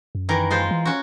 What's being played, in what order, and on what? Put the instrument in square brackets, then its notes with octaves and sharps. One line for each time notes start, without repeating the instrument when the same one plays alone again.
[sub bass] F#2
[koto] D#3 E3 A#4
G#3 F4 C5
[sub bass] E3
[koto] C#4 F#4